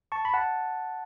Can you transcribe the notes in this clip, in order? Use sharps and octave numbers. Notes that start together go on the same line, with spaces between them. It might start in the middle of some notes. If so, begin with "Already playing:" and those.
A5 C#6
B5
F#5 A5